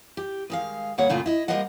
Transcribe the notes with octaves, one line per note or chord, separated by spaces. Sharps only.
G4
D#3 G#3 F5
D#2 G#2 G3 A#3 C#5 F#5
F#2 A#2 C#3 A3 A#3 F4
E4 D#5
G3 A#3 A#4 C5 D#5 F#5